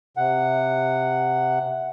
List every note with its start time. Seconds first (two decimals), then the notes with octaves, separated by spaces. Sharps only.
0.17 C3 F#5